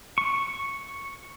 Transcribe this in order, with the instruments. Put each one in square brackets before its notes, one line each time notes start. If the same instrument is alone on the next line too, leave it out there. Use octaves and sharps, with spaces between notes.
[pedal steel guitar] C#6